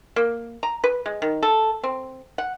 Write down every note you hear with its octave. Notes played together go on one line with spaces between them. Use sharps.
A#3
A#5
B4
G#3
D#3
A4
C4
F#5